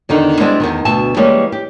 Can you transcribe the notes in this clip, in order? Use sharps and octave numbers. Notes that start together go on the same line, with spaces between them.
E2 D3 D#3 D#4
G3 G#3 B3 C4 D4 E4
E2 G#2 D#3
D2 B2 E5 A5
E3 G3 G#3 A#3 C#4
G4